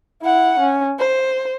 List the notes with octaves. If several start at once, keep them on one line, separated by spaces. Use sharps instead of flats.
E4 F#5
C#4
C5